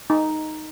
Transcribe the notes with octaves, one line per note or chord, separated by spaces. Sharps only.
D#4